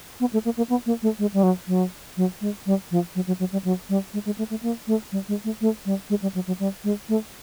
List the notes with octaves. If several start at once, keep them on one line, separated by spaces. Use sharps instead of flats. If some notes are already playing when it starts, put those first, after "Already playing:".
B3
A3
A#3
A#3
B3
A#3
A3
G#3
G3
F#3
F#3
F#3
G#3
G3
F3
F#3
F#3
F#3
G3
F#3
G3
G#3
G#3
A3
A3
A#3
A3
G3
G#3
A3
A3
G3
G#3
G3
F#3
F#3
G3
G#3
A3